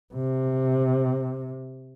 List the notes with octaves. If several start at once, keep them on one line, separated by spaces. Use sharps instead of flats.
C3